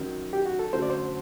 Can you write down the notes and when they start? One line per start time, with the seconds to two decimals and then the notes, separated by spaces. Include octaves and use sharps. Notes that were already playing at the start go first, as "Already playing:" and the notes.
Already playing: F#2 D#3 F#3
0.33 G4
0.46 F#4
0.59 A4
0.73 F#2 D3 F#3 A3 C5
0.82 D5
0.90 C5